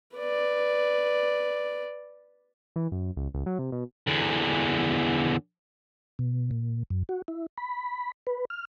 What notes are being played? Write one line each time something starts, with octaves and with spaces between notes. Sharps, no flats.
B4 D5
E3
F#2
C#2
C#2
F#3
C3
B2
E2 D3
B2
A#2
F#2
F#4
E4
B5
B4
F6